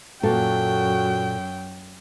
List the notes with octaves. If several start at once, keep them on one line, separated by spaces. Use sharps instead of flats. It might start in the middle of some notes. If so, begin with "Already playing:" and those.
F#2 A#2 F#4 A4 G5